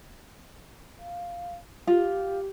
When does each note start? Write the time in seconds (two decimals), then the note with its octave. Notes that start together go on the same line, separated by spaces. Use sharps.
0.98 F5
1.87 F4 G4